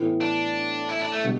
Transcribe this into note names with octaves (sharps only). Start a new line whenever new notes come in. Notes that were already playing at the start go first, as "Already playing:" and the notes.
Already playing: A2 E3 B3
D4
E4
D4
A3
B2 G3 D4